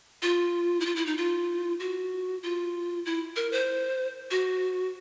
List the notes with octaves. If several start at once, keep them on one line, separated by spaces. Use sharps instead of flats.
F4
E4
F4
E4
D#4
F4
F#4
F4
E4
A#4
C5
F#4